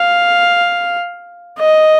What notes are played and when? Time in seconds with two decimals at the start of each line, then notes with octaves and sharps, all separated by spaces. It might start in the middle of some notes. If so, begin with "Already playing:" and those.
Already playing: F5
1.59 D#5